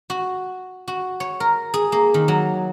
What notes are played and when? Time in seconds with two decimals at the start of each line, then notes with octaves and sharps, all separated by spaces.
0.10 F#4
0.88 F#4
1.20 C#5
1.40 A#4
1.74 G#4
1.92 A#3
2.14 D#3
2.28 F#3